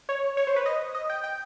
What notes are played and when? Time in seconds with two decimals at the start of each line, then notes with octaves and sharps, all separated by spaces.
0.09 C#5
0.37 C#5
0.47 C5
0.56 B4
0.66 D#5
0.95 D#5
1.10 G5
1.24 G5